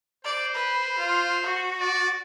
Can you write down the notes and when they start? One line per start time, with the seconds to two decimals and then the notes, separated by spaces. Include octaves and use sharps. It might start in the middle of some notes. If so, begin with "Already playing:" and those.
0.25 C5 D5
0.55 B4
0.98 F4
1.44 F#4
1.80 D5